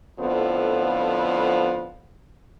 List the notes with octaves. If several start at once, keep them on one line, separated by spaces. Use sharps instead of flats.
F2 A2 D3 F3 B3